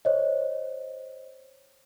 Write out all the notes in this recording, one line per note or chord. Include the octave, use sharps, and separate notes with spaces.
C5 C#5 D#5